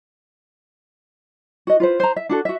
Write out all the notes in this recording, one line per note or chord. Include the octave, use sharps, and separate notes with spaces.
F#4 D#5
F4 B4 C5
C5 A#5
E5
D4 F#4 A4
F#4 E5